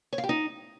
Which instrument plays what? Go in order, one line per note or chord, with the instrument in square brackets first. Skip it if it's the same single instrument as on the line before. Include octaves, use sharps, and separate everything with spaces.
[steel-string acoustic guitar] C#5
F5
G4
D#4